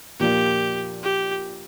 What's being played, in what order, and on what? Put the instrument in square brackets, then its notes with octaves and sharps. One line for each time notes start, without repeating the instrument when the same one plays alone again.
[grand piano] A#2 F3 A#3 D4 F4 [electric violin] G4
[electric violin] G4